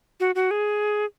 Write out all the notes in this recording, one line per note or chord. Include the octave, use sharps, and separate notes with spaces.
F#4
F#4
G#4